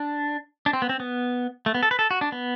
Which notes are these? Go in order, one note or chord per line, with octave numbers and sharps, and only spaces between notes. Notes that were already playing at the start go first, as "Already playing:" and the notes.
Already playing: D4
D4
C4
B3
C4
B3
A3
B3
A4
B4
A4
F#4
D4
B3